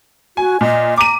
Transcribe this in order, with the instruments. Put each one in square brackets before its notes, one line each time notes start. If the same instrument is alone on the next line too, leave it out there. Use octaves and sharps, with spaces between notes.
[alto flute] F#4 [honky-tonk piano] G#5
[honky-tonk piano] A#2 [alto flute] D#5
[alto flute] A#5 [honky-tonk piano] D6 D#7